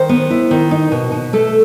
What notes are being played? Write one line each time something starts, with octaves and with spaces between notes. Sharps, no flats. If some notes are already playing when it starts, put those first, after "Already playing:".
Already playing: D#3 C5
B3
E4
D#3
D#4
B2
B2
A3 A4